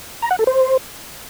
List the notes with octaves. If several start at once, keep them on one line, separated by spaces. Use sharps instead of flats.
A#5
F#5
A4
C5